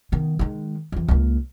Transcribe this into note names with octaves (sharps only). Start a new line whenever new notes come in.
D#3 B3
D#3 G#3
F2 E3
C#2 A#3